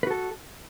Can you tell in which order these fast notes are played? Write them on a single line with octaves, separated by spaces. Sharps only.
B4 F#4 A4